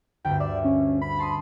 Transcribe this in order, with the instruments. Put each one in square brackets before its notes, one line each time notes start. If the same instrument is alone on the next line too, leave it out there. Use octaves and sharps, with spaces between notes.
[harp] D2 G2 [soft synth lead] G5
[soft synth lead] D5 [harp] E5
[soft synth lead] C#4
B5
[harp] A5 C6 D#6